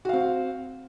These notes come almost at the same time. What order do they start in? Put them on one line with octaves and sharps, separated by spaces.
F#4 F5 C4